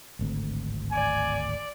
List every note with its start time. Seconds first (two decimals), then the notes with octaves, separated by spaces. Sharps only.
0.19 D1 G#1 D2
0.92 D5 G#5